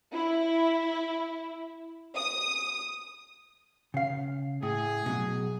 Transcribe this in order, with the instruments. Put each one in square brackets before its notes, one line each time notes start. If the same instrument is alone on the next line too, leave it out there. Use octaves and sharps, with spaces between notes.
[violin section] E4
D#6
[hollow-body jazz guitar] C#3 F5
[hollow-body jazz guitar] A2 [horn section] G#4
[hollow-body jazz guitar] B2 F#3